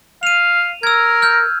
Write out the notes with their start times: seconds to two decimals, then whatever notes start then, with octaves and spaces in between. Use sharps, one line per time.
0.23 F5 D#7 F7
0.83 A#4 E6 G#6
1.22 F6 G6